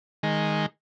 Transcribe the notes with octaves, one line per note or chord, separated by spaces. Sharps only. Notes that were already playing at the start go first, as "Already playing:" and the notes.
D#3 G#3